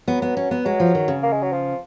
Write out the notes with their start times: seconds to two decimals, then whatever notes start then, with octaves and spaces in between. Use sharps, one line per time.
0.08 F#3 B3
0.22 B3
0.37 C#4
0.51 B3
0.65 F#3 G#3
0.80 F3
0.95 D#3
1.08 C#3
1.23 A#3
1.32 G#3
1.42 F#3
1.52 F3